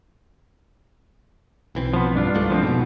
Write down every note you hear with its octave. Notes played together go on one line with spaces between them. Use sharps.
B1 E3 C4
F3 B3
G2 D4 F4
C2 G#3 A3
F3 B3 C4
E2 G#2 B2